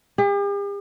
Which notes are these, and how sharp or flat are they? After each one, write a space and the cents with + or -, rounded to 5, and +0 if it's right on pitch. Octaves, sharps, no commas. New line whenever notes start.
G4 +45